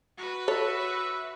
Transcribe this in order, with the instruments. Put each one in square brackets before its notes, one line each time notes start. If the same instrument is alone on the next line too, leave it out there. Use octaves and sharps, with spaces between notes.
[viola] F#4 B4
[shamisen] A4 C#5 [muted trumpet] E5